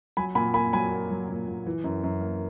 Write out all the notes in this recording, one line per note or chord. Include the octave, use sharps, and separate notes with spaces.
F#3 G#5 B5
A#2 G#5 B5
A#3 G#5 B5
F#3 G#5 B5
A#3
F#3
A#2
A#2
E3
F#2
F#2
A#3